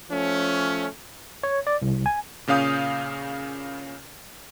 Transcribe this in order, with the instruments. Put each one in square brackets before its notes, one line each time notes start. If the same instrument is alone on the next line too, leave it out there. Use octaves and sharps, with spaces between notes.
[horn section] F3 A3 C#4
[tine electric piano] C#5
D5
C2
G#5
[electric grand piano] A#2 C#3 C#4 F5 D#6 G6